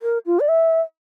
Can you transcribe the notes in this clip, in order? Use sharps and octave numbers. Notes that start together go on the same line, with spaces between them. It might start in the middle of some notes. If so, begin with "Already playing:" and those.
A#4
F4
D5
E5